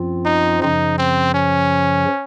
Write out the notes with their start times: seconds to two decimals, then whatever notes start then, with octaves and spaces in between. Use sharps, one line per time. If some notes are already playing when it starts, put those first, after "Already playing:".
Already playing: F#2 F3 C4 F4
0.26 D#4
0.62 F#2 C#3 F3 D#4
0.98 C4
1.34 C#4